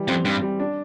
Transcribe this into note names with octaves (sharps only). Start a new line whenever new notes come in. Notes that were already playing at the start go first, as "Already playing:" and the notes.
Already playing: E3 G3
F2 C4
G2 C4
G3
D4